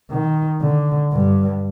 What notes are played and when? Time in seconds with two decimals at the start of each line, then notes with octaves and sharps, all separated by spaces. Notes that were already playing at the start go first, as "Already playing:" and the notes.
0.11 D#3
0.61 D3
1.12 G2